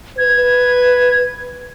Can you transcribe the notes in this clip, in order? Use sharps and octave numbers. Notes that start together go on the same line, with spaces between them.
B4 G#6